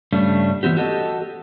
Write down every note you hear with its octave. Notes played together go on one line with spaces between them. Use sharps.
G2 C#3 G3 A3 D4
E3 B3 C4 G4
F#4 G4 A4 D#5